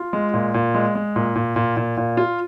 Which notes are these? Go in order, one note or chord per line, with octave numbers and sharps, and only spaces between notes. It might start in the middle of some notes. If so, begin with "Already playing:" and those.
Already playing: F4
G#3
A#2
A#2
G#3
G#3
A#2
A#2
A#2
A#2
A#2
F4